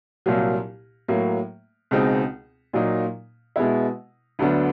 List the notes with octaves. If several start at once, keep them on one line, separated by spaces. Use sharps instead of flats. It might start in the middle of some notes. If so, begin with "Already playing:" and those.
C2 A#2 F#3 A#3
A2 F#3 A#3
C#2 B2 G#3 C4 D#4
A#2 F#3 A#3 D#4
B2 G#3 B3 E4
D2 D3 F#3 B3 D4